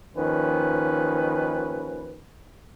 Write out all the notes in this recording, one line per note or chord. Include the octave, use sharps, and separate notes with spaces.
D#2 D#3 F3 C#4 B4